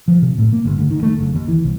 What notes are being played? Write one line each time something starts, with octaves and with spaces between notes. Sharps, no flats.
F3
C3
A2
A#3
G1
D2
D#3
A3
F#1
D#2
E3
C2